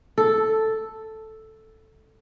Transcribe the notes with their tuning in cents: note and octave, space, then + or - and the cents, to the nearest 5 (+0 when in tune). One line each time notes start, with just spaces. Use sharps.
A4 +0